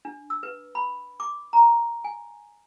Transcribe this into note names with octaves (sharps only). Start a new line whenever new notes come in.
D4
E6
B4
B5
D6
A#5
G#5